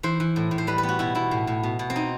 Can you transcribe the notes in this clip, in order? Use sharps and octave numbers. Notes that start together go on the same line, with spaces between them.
E3 C5
E3
A2
A2
C5
G3 B4
B4
B3
F#4
B2 E4
B2 E4
A2
A2
B2
B2
C4
D#4